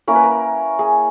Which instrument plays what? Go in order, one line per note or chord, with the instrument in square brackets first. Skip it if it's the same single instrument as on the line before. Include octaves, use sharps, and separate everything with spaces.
[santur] A#3 C#4 E4 A#4
B4
A#4
G#4